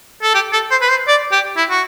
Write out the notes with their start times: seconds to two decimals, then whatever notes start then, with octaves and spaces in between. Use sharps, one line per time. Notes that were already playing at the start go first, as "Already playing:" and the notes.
0.22 A4
0.34 G4
0.53 A4
0.71 C5
0.81 B4
0.89 C5
1.08 D5
1.32 G4
1.56 E4
1.70 F#4